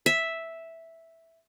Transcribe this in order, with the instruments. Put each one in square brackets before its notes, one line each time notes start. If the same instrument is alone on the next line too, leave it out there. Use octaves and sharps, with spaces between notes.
[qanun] E5